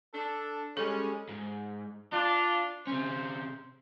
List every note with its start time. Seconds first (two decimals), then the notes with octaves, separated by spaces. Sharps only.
0.14 D4 A4
0.77 G3 G#3 C#4 A4
1.29 G#2
2.13 D4 F4
2.87 C3 C#4 C5